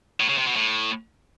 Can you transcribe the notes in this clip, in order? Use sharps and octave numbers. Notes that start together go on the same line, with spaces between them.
A2
C#3
C3
B2
A2